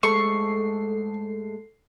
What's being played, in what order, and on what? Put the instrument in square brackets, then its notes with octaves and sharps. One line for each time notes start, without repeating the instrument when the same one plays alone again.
[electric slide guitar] G#2 G#3 A3 [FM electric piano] A4 C7 [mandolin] C#6